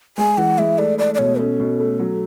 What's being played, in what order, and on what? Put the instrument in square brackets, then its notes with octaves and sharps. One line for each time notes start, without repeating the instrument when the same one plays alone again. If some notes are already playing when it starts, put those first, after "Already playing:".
[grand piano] G#3 [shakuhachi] G#5
[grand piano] E3 [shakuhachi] F#5
[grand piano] G#3 [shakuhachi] E5
[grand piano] A3 [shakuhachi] D5
[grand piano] A3 [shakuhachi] D5
[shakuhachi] D5
[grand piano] B2 [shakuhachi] C#5
[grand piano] C#4 [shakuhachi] A4
[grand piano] B2
A3
F#3